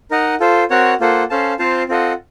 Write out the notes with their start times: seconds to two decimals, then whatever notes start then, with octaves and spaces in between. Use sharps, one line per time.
0.11 D#4 A#4 D#5 F#5
0.40 F4 A4 C5
0.70 C4 F#4 A#4 C#5 F#5
1.00 A#3 F4 A4 C5 F#5
1.30 C#4 A4 C5 F5 A5
1.59 C4 F4 C5 F5 A5
1.89 C4 F4 A4 D#5 F#5